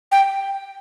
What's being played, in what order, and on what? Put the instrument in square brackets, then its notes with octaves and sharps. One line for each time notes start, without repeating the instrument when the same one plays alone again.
[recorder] G5